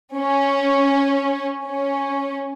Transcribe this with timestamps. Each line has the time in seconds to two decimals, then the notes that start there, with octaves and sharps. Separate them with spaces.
0.17 C#4
1.67 C#4